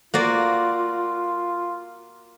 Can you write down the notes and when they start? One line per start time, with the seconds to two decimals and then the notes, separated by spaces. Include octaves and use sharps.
0.14 A#3 F4 F#4 D5